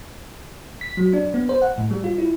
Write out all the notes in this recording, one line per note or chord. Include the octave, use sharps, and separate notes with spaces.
B6
F#3
D4
B3
C5
F#5
A2
G3
F4
E4